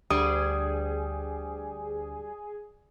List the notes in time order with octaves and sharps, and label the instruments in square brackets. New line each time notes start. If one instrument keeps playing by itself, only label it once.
[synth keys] D2 [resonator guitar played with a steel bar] G3 [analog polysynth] G#4 [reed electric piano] D#6